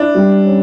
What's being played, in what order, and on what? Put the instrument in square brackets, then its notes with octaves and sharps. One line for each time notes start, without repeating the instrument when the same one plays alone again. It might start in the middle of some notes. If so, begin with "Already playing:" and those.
Already playing: [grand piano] D4 [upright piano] E4
[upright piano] G3
C#4